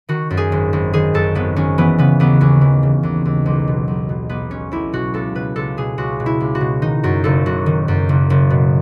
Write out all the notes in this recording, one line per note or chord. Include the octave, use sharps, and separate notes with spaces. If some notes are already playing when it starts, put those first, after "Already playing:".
D#3 F#4
F#2
G#4
G#1
G#1
D#3 G#4
F#2 A4
G#1 B3
G#1 C#4
E3 B3
C#3 B3
D#2 B3
D#2 C#4
E3
C#3
D#2
D#2
B1
B2
B1
B2
B1 B3
B2 C#4
B1 E4
B2 F#4
C#2 A4
B2 B4
C#2 A4
B2 G#4
C#2 F#4
B2
E4
C#2
F#4
B2
D#3 D#4
F#2 F#4
F#1 A4
F#1 F#4
D#3
F#2
F#1
F#1
B2